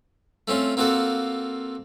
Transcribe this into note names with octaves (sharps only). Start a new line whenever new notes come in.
A3 C4 C#4 F4
A#3 C4 F4 F#4 A4